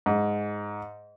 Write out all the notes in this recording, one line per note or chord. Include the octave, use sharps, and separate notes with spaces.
G#2